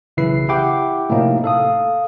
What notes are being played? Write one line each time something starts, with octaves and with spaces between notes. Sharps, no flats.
B1 C#3 E3 E4 B4 C7
E4 G4 F#5 G5 D6
A2 C3 F3 A3 A#3 D#4
A4 F5 D#6